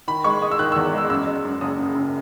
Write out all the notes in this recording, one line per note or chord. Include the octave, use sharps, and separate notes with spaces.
D#3 B5
G#3 C#6
G#3 D#6
E6
D#3 F#6
E2 E6
G#3 E6
F#2 E6
G#3
F#2
F#1 D#6
C#3
F#2